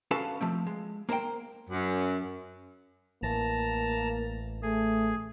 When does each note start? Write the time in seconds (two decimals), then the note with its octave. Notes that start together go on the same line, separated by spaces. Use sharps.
0.11 C#4 F#4 A4 B4 F5 A5
0.41 F3 A3 C4
0.67 G#3
1.09 A#3 A#4 C5 F5 G5
1.70 F#2
3.23 A1 A#3 A5 A#5
4.62 A3 G#4